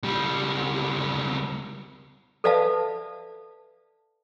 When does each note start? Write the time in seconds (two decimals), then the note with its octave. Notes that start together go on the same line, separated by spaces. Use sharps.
0.03 C#2 G3
2.44 A4 B4 D5 E5 F5 A5